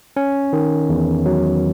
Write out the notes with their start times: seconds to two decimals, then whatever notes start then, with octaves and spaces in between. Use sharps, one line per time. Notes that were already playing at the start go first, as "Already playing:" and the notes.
0.17 C#4
0.53 D#3
0.89 E2
1.26 F#3